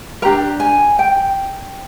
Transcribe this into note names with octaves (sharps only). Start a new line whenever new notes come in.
D4 G4 A#4 A#5
G#5
G5